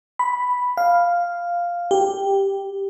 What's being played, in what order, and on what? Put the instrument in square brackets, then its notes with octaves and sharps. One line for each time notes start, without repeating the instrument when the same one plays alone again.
[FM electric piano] B5
F5
G4